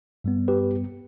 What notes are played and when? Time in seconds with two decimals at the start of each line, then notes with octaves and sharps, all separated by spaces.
0.24 G2 G3 B3
0.48 G4 B4